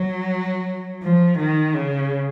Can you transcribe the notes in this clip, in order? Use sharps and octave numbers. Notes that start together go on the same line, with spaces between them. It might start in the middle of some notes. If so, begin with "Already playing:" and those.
Already playing: F#3
F3
D#3
C#3